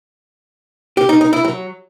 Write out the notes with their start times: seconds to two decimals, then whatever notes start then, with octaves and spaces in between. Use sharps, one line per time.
0.97 G4
1.09 D#4
1.21 D#4
1.33 E4
1.44 F#3